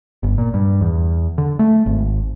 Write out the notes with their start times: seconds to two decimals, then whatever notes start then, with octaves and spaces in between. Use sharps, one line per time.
0.23 G1
0.38 A#2
0.54 G2
0.81 E2
1.38 D3
1.59 A3
1.86 G#1